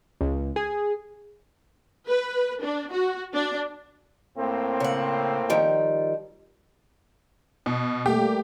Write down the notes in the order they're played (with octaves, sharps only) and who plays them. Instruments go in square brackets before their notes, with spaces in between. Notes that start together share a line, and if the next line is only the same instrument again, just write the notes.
[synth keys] C#2
G#4
[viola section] B4
D4
F#4
D4
[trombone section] A2 A#3 C4
[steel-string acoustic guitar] C#3 F#5
D#3 F3 G3
[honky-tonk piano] B2
[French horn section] G3 A3 A#3 [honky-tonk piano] G4